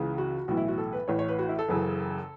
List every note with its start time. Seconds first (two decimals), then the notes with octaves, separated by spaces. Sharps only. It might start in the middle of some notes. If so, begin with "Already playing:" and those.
Already playing: C#2 C#3 E3
0.18 F#4
0.48 B1 A2 E3 F#4
0.57 E4
0.68 F#4
0.78 A4
0.93 B4
1.08 A1 A2 E3 C#5
1.19 C#5
1.28 B4
1.39 F#4
1.49 E4
1.59 A4
1.68 F#1 F#2 C#3 E3